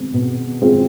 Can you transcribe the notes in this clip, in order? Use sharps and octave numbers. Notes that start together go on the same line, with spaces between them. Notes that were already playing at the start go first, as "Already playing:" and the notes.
Already playing: B2 G#3 C4
B2
G#3 C4 F4